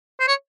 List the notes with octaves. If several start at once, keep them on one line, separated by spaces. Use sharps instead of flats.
C5
C#5